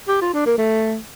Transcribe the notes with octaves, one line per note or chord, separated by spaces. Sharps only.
G4
F4
D4
A#3
A3